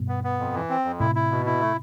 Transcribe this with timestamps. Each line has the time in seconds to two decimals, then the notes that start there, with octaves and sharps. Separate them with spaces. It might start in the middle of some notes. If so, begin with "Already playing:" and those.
Already playing: G2 B2
0.08 B3
0.24 B3
0.39 F2
0.54 E3
0.70 C4
0.85 F2
1.00 A2 C3 E4
1.15 E4
1.31 B2
1.46 E4
1.61 A3